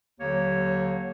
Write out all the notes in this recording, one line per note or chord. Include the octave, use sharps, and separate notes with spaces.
D#2 D3 F#3 A#3 C#5